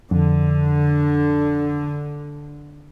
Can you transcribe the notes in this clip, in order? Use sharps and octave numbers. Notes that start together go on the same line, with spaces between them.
F2 D3